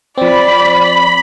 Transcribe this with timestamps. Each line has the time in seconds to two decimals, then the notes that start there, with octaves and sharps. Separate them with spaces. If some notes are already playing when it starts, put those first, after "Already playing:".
0.18 F3 C4 D5 B5